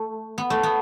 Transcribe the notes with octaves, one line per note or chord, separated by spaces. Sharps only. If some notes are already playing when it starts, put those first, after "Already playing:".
Already playing: A3
B3
A3
B3